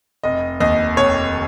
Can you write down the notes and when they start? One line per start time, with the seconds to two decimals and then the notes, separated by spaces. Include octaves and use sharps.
0.24 F1 D#5
0.60 D#2 D#5
0.96 F1 C#5